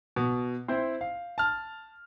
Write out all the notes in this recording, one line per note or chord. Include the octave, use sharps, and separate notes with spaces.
B2
C4 E4 C5
F5
A5 F6